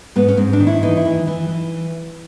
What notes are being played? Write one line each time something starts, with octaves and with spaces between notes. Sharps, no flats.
G#2 B3
C#4
G#2 C4
D4
D#3
E4
E3 D#4
E4
E3
E3
E3